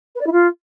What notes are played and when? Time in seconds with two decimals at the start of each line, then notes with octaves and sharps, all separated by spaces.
0.15 B4
0.21 D5
0.27 E4
0.32 F4